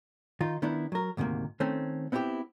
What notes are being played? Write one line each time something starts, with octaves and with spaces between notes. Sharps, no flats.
D#3 D#4 F4
D#3 B3 D4 E4
F#3 A#4
D2 G#2 C3 D#3 A#3
D#3 A3 C4 C#4
B3 C4 E4 F4 G4